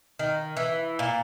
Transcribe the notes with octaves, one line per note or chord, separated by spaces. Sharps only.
D#3
E3
A#2